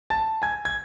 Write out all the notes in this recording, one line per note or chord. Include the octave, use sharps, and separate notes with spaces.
A5 A6
G#5 G#6
G#6